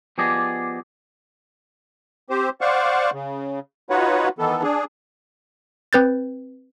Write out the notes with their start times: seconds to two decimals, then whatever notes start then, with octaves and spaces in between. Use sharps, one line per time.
0.18 F3 B3 G4 G#4 D5 D#5
2.30 C4 G4 C5
2.61 C5 D5 F5 F#5 C#6
3.13 C#3
3.90 D#4 F4 F#4 B4 C#5 F#5
4.39 D#3 E3 B3 A4
4.63 D4 G#4
5.93 C4 B4 G6 A6